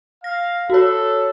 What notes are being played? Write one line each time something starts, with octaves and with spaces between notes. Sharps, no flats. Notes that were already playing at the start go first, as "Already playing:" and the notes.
F5 A#6
F#4 A4 C#5